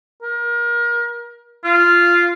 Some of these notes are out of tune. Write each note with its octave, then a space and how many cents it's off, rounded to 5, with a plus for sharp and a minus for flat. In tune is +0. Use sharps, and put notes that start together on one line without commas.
A#4 +30
F4 -10